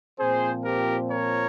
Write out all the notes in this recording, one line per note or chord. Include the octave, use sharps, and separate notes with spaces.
A#2 F3 C4 G#4 C5
G4 A#4
A#4 C#5